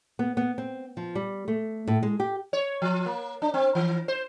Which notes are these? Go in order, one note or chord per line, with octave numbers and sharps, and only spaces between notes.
B3
B3
C4
F3
G3
A3
A2
G#3
G4
C#5
F3
A#3
D4
C4
E3
C5